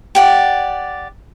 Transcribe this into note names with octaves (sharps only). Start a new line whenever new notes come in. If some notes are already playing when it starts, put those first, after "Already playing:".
G4 D5 F#5